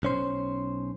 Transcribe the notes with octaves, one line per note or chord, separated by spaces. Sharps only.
B1 C#4 C5